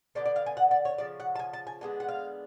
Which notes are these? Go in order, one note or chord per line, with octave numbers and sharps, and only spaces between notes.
D3 G#3 B3 D5
D5
F5
G#5
F#5
D5
C#5
C#3 F3 D5
F#5
A5
G#5
A5
G#5
D3 G#3 B3 D4 G#5
F#5
F5